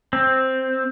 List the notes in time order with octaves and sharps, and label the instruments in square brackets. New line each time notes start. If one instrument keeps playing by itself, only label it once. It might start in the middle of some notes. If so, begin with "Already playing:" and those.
[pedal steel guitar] C4